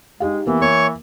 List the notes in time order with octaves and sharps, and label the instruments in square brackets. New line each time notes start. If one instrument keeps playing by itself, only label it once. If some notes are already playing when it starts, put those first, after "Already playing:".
[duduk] G#3 [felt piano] D#4 G4 F5
[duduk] E3 [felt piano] A#3 B3 G4
[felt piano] A#3 [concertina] C#5 C#6